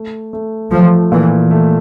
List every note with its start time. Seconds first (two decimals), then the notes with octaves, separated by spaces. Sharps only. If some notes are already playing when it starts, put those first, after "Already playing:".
Already playing: A3
0.33 A3
0.71 F3 A3
1.11 A#2 E3
1.51 A3